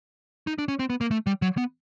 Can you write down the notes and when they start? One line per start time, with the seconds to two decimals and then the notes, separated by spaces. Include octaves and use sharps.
0.47 D#4
0.58 D4
0.68 C#4
0.79 C4
0.90 B3
1.01 A#3
1.11 A3
1.27 G3
1.42 F#3
1.57 B3